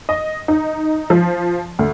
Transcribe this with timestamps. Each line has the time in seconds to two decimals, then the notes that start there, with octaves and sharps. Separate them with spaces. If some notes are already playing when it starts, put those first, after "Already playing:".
0.09 D#5
0.48 D#4
1.10 F3
1.79 D2